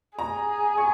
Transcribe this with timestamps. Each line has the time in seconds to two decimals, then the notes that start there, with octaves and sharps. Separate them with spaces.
0.19 G#4 A#5
0.78 C#6